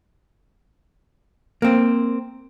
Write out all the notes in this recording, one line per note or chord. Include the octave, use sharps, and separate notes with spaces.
A#3 C4